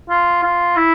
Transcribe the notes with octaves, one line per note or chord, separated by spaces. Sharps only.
F4
F4
E4